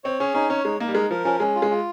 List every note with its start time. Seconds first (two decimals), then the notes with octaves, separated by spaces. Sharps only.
0.04 C4 C#5
0.20 C#4 G#4
0.34 C#4 D#4
0.49 C#4 C#5
0.65 G#3 D#4
0.80 A#3 D#4
0.88 G3
0.95 G#3 A#4
1.10 F3 A#4
1.25 F3 C#4
1.40 G#3 C#4
1.55 F4
1.62 G#3
1.70 F4